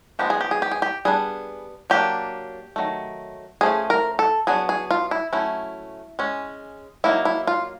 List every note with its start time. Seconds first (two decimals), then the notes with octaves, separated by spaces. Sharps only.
0.19 F3 G#3 B3 D#4 G4
0.30 G#4
0.41 G4
0.51 G#4
0.62 G4
0.71 G#4
0.82 G4
1.05 G3 B3 D4 G#4
1.90 F#3 A#3 D4 G4
2.76 D#3 F#3 A3
3.61 F3 A3 C#4 G#4
3.90 A#4
4.19 A4
4.47 F#3 B3 D4 G#4
4.69 G#4
4.91 F4
5.11 E4
5.33 F#3 A3 C#4 E4
6.19 G#3 C#4
7.04 F#3 A#3 D#4 E4
7.25 E4
7.47 F4